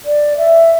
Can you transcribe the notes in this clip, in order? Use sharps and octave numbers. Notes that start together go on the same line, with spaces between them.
D5
E5